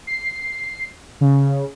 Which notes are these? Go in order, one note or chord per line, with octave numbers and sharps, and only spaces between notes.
C7
C#3